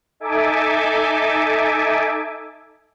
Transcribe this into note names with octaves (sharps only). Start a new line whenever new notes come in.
D#4 A4 E5 G#5 D6